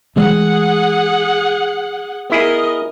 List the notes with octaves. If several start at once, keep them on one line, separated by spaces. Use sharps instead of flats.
E3 G#3 A3 G#4 F#5
B3 E4 G#4 A#4 D#5